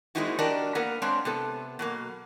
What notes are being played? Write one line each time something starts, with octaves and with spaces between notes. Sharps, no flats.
G#3 A#3 C4 D#4 E4 F#4
D4 F#4 G4 A#4 D5 D#5
A#3 B3 A#4 B4 F#5
G#3 C4 D4 C#5 F5
C3 B3 A4
B2 F#3 A#3